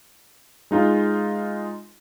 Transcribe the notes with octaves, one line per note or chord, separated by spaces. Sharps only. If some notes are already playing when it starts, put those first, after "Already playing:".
G#3 D#4 F4